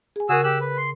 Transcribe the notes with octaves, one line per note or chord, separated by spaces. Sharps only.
G#4 G#5
C#3 F#4 G#4 A#4 E6
G4 E6 F#6
B4
C6